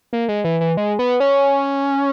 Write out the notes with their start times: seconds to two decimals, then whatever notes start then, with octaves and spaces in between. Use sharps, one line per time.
0.13 A#3
0.29 G#3
0.44 E3
0.61 E3
0.77 G#3
0.99 B3
1.20 C#4